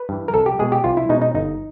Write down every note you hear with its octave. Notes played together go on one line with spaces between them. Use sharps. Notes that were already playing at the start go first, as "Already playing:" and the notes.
Already playing: B4
G2 E3
A#4
C2 A4
G4
B2 G#3 G#4
G4
C2 F4
E4
B2 G#3 D#4
D#4
G1 D#4